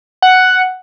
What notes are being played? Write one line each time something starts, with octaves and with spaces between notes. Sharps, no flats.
F#5